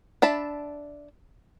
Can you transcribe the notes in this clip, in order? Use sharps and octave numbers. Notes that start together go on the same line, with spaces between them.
D4 E5 A5 B5